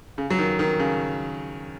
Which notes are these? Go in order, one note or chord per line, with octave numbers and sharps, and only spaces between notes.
C#3
F#3
D#3
D#3
C#3